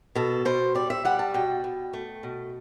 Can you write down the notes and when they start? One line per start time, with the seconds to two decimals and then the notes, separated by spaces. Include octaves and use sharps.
0.15 B2 A4
0.45 B2 C5
0.75 G3 D5
0.90 E5
1.05 G3 F#5
1.19 A5
1.34 B2 G5
1.64 B2
1.93 A3
2.23 B2